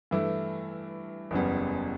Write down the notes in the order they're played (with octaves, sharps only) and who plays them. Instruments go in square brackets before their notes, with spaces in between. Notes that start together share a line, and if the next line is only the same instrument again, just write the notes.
[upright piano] G2 E3 A3 E4
F#1 E2 C#3 G3 B3